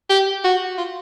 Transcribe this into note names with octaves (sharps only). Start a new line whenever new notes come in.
G4
F#4
F4